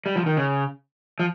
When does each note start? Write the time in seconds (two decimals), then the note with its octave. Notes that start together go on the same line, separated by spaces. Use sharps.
0.06 G3
0.16 F3
0.26 D#3
0.37 C#3
1.20 F3